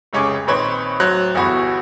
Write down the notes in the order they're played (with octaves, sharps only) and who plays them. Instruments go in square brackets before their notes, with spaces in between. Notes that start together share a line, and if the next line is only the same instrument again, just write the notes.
[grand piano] F1 C#2 C#4 G#4 D6
A#1 D#3 C4 B4 C#5
D1 F#3 C5 F#6
G1 E2 E3 F#4 B5